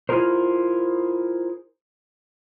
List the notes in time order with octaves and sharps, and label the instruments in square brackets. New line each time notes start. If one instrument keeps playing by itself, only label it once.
[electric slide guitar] E4 F4 G#4 A#4 C5